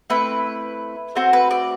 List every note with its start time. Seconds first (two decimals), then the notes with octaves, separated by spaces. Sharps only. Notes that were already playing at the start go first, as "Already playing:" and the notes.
0.10 A3 C4 E4 B4
1.15 A3 C4 F#4 C5
1.33 B4
1.51 D5